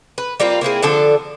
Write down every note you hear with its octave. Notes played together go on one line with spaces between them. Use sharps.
B4
G3 A#3 C4 F4
A#3 C4 E4 G#4
D3 F3 D4 A4